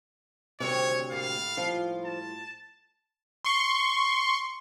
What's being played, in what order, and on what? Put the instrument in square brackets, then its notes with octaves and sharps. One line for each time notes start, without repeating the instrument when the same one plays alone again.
[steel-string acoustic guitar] D2 C3 [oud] D#3 G3 C4 [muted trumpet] C#5
[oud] A2 G3 A#3 [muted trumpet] F5
[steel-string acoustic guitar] F3 F4
[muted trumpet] A5
[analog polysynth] C6 C#6